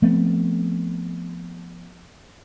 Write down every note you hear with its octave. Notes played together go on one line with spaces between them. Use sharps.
F3 A3 B3 C4